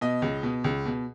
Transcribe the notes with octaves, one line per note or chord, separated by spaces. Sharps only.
B2 D#5
C#2
B2
C#2
B2